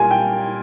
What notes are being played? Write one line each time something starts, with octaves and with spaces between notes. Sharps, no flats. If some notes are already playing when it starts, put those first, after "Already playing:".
Already playing: A#2 G3 A#4 G#5
G5